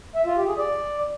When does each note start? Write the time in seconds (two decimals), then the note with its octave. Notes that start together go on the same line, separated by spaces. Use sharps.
0.15 E5
0.26 F4
0.37 G4
0.47 G#4
0.58 D5